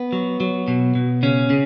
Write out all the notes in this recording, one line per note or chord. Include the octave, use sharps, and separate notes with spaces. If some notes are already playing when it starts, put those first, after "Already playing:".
Already playing: B3
F#3
F#3
B2
B2
C#3 C#4
C#3